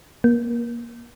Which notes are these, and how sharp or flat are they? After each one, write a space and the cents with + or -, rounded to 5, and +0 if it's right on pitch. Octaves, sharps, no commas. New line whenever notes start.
A#3 +25